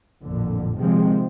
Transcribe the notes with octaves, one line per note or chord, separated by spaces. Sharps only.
A1 F2 A#2 D3
C3 D#3 F3 G#3 C4